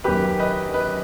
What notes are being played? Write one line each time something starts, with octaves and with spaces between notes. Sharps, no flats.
F#2 D#3 G4 B4
B4 D#5
B4 D#5